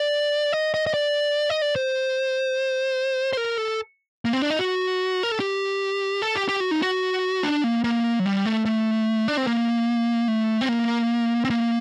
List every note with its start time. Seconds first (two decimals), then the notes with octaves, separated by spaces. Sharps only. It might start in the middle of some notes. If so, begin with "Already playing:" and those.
Already playing: D5
0.53 D#5
0.74 D#5
0.87 D#5
0.94 D5
1.50 D#5
1.62 D5
1.76 C5
3.33 C5
3.37 A#4
3.58 A4
4.25 A#3
4.33 C4
4.42 D4
4.50 D#4
4.59 F#4
5.23 A#4
5.32 A4
5.40 G4
6.22 A4
6.36 G4
6.49 G4
6.60 F#4
6.71 D#4
6.82 F#4
7.43 D4
7.64 A#3
7.84 A#3
8.20 F#3
8.25 G3
8.46 A3
8.65 A3
9.28 D4
9.37 C4
9.47 A#3
10.28 A3
10.61 C4
10.69 A#3
11.45 C4
11.50 A#3